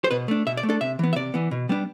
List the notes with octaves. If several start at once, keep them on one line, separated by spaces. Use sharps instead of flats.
C5
B2 B4
A3 D4
B2 E5
D5
A3
D4 A4
C3 E5
E3 B3
E5
C3 D5
E3 B3
B2
G3 B3 D4